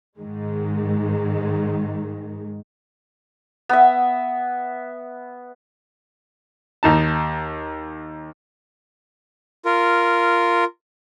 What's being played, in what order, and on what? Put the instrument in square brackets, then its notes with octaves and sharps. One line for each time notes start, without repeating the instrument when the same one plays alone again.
[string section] G#2 D#3 G#3
[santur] B3 E5
[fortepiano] D#2 D#4 A5
[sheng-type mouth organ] F4 A#4